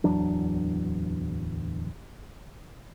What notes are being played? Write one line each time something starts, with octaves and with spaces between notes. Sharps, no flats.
D1 E2 F#3 D4